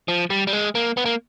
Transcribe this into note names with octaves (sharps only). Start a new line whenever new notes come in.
F3
G3
G3
G#3
A#3
B3
A#3